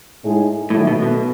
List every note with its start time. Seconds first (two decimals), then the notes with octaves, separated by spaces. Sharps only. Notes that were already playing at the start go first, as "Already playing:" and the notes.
0.23 A2 G#3 D#4 G#4
0.70 A2 D#3 F#3 A3
0.87 B2
1.02 B2